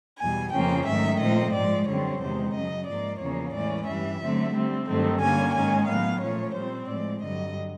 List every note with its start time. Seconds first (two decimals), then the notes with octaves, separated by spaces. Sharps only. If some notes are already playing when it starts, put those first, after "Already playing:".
0.20 E2 B2 G3 G#5
0.53 F2 C#3 F3 A#3 C#4 G5
0.86 G#2 D#3 F#3 A3 E5
1.20 A#2 F3 A3 C4 D#5
1.53 G#2 F3 G#3 D5
1.87 F#2 D3 G3 C4 C#5
2.21 E2 C3 D#3 G#3 C5
2.54 F#2 C#3 F#3 D#5
2.87 G#2 F3 A#3 D5
3.21 E2 C#3 F3 A#3 C#4 C#5
3.54 A2 E3 G#3 C#4 D5
3.88 G2 E3 G3 E5
4.22 D3 F#3 A3 C4
4.54 D3 G3 C4
4.88 G2 D#3 F#3 A3 C4
5.21 D3 G3 A#3 C#4 G#5
5.55 G#2 D#3 G#3 C#4 G#5
5.88 A2 F#3 B3 F5
6.22 A#2 F3 A3 C#4 C#5
6.55 A#2 G3 C4 C5
6.88 A2 F3 G#3 D5
7.22 G2 D3 F#3 D#5